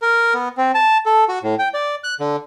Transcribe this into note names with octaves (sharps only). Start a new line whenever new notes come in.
A#4
B3
C4
A5
A4
F#4
A2
G5
D5
F#6
D3